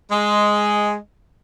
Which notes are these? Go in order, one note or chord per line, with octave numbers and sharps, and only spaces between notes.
G#3